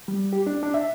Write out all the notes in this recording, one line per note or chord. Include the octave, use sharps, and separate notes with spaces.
G3
G4
D4
D4
E5